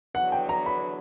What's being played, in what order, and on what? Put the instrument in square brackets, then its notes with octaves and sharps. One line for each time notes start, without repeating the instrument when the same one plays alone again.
[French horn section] E2 D3 F#3 B3 D4 [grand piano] F#5
[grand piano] G5
A#5
B5